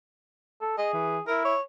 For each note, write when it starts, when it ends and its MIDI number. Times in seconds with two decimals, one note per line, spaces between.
0.61 0.77 69
0.78 1.21 68
0.78 0.90 75
0.93 1.18 52
1.27 1.54 64
1.27 1.45 70
1.45 1.61 73